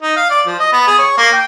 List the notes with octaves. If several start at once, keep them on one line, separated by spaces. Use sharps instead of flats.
D#4
F5
D5
F3
D#5
B3
G#4
C#5
A#3
G5